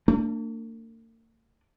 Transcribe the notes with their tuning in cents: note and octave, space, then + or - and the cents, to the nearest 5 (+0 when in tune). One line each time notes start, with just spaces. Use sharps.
A#3 -45 D4 +0